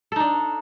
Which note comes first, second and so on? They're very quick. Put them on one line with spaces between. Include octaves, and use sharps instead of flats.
A4 D#4 D4